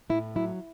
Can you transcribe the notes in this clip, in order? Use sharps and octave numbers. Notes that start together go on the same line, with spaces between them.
A2 E4
F#3 E4